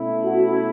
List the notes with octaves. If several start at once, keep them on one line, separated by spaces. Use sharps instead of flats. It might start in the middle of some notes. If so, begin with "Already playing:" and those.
Already playing: B2 A3 C#4 E4
F#4